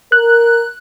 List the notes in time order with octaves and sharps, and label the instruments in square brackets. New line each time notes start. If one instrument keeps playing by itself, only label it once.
[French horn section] A#4 [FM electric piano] F#6